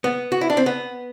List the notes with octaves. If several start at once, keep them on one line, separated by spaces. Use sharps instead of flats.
B3
F#4
E4
D4
C4
B3